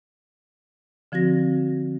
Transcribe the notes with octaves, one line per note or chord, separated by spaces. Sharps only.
D3 F3 C4 F#4 A#6